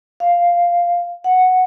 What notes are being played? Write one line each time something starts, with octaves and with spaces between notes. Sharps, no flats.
F5
F#5